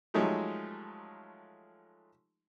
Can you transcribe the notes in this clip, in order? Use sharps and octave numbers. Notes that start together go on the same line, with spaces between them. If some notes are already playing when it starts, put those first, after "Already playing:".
F3 F#3 G#3 A3 D#4 G4